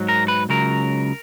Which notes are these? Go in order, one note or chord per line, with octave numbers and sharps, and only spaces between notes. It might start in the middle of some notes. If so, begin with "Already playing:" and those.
Already playing: G#2 F#3
A#4
B4
C#2 C#3 F#3 A#4